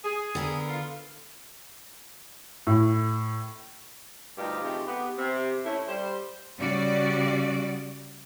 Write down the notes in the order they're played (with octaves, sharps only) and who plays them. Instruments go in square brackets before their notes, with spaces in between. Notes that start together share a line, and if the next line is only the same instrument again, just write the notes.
[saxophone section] G#4
[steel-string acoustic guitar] D3 B3 A#4
[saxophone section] F4
[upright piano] A2
[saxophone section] D2 G2 D#4 F4 G4
C3 F3 G#3 A3 D#4 G4
B3 G4
C3
A3 C#4 E4
G3 C5
[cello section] C#3 G3 F#4 D5